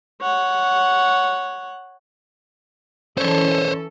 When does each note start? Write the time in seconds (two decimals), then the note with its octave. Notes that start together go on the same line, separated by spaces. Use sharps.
0.22 C#5 F#5
3.18 E3 C#4 A4 C5 C#5